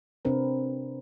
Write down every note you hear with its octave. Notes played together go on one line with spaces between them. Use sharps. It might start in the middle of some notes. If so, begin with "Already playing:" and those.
C3 C4 D4 A#4 B4